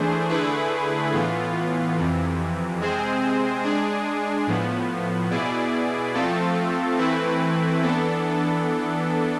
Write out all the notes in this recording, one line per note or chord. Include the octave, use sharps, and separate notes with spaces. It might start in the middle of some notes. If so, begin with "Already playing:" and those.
Already playing: E3 A3 D4 G#4 C5
D3 A3 E4 G#4 B4
A2 E3 B3 F4
F2 C3 E3
C3 G#3 C4 G#4 C5
G#3 D4 G#4
A2 F3 B3
B2 B3 E4 G#4 D5
F3 A3 C4 F4 A4
E3 A3 C4 E4 B4
E3 B3 D4 A4